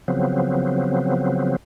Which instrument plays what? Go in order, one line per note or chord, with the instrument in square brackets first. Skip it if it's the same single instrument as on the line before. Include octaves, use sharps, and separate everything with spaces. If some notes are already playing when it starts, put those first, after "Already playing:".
[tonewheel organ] C#3 F3 F#3 B3 C4